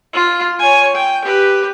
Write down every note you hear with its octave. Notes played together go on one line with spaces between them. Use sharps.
F4
C#5 G#5
G5
G4 B4